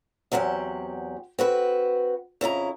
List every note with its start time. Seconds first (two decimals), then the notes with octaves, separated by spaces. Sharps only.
0.32 E2 F#3 C4 G4 F#5
1.39 C4 F#4 B4
2.41 F2 C#3 E4 A#5